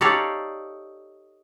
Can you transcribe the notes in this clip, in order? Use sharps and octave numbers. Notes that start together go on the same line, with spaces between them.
D#4 G4 A4 C#5 D5 F5